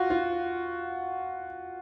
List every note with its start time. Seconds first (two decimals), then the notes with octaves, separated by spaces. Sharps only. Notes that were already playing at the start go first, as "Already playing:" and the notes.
Already playing: F4 F#4
0.10 F4